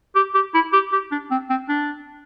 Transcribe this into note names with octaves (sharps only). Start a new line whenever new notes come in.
G4
G4
E4
G4
G4
D4
C4
C4
D4